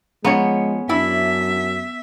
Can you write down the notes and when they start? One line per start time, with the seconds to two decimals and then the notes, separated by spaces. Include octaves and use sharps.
0.24 F3 G#3 B3 C#4 C#5 A#5
0.89 F#2 D4 E4 E5